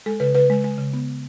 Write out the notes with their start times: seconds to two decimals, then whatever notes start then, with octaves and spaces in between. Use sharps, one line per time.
0.06 G#3 A4
0.20 C#3 B4
0.35 C#3 B4
0.50 G#3
0.64 G#3
0.78 C#3
0.93 B3